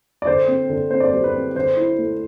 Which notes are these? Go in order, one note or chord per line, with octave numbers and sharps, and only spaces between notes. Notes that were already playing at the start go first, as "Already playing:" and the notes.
D5
D3 C5
C4
D3
C4 C5
D5
G3 C5
B4
C4
D3 C5
E4
A3